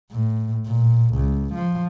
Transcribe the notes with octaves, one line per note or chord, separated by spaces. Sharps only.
A2
A#2
C#2
F3